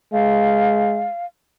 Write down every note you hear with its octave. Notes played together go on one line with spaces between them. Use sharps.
G#3 F5